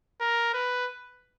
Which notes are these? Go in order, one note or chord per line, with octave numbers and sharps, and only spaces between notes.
A#4
B4